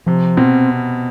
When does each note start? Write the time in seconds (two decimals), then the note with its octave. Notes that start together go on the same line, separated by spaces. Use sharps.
0.06 C3 F3
0.37 B2 C4